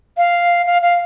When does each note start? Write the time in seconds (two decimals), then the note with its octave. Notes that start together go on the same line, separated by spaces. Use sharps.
0.17 F5
0.66 F5
0.82 F5